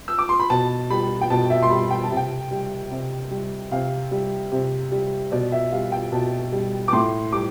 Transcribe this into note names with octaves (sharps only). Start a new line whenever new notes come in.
E6
D6
C6
B5
B2 A5
G3 B5
G5
B2 A5
E5
C6
G3 B5
G5
A5
C3
G5
G3
C3
G3
C3 F5
G3
C3
G3
B2 D5
E5
G3 F5
G5
B2 A5
G3
D6
A2 C6
G3 D6